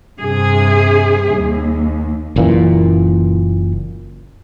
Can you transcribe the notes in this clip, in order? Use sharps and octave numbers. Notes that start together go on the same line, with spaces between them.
G2 C3 G#4
D#2
F#1 A#2 E3